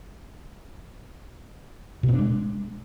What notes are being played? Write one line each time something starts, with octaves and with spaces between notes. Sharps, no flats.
B2
B3
D4
G#3